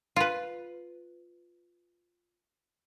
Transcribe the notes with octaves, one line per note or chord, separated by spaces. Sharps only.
F4 B4